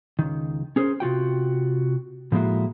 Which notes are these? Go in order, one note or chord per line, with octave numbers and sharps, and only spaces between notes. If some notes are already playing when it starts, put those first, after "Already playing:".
C#2 D#3
C#4 G#4 A#4 C5
C3 F4 F#4 G5
A2 F3 G#3 A#3 E4 F#4